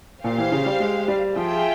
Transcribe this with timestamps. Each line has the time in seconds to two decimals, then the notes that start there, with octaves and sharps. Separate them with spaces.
0.24 A#2 G4 C5 F5
0.38 E3
0.52 C#3
0.66 G3
0.80 G#3
1.08 G3
1.36 F3 F4 G#4 E5 G5